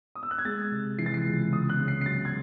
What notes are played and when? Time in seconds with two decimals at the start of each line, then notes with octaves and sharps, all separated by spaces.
0.15 D#6
0.23 E6
0.31 F#6
0.38 G#6
0.45 G#3 A6
0.72 C3
0.98 E3 C7
1.06 A6
1.14 C7
1.26 C#2
1.52 C#2 D#6
1.70 F#6
1.79 C#3
1.88 C7
2.01 C7
2.06 F#3 A6
2.25 G#6